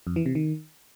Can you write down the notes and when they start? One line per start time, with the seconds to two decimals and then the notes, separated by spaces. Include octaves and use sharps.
0.07 F2
0.16 E3
0.26 C3
0.35 D#3